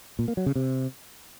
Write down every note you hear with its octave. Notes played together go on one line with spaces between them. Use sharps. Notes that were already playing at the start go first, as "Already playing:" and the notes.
A#2
A#3
F#3
C#3
C3